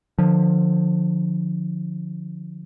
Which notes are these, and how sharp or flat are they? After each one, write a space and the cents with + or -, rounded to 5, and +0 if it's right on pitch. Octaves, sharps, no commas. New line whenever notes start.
D3 +40 F3 +20